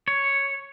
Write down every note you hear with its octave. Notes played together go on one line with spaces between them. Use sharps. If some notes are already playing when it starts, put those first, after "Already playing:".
C#5